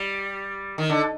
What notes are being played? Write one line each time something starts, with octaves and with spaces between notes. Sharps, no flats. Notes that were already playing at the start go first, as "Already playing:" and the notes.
Already playing: G3
D#3
D3